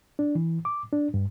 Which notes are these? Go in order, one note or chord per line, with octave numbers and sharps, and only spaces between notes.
D4
E3
D6
D4
G2